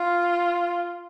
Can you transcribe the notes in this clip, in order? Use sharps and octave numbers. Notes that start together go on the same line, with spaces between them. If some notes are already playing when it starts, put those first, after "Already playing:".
Already playing: F4